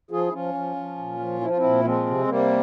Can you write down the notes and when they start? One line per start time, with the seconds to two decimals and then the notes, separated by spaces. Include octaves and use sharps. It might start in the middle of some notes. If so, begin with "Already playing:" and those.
0.11 F3 F4 G#4
0.29 E4
0.33 F3 C#4 F4
0.54 F3
0.76 F3
0.98 A#2
1.19 F3
1.41 F3 E4
1.50 F4
1.57 C4 E4
1.63 A#2
1.84 F3 G#3 C4
2.06 C3
2.28 C3 G3 A#3